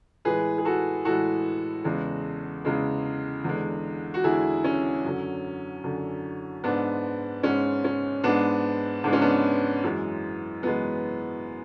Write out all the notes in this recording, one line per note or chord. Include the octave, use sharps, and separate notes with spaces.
A2 E3 G#3 G#4 B4
G#4
F#4 A4
A2 E3 G#3 F#4 A4
E2 C#3 G#3
E2 C#3 G#3
E2 D3 G#3
F#4
E2 D3 G#3 E4 G#4
C#4
F#2 D3 F#3
F#2 D3 F#3
G#2 G#3 B3 D4
G#2 G#3 C#4
C#4
G#2 G#3 B3 D4
G#2 G#3 D4
C#4
B3 D4
F#2 E3 G#3
F#2 E3 G#3 B3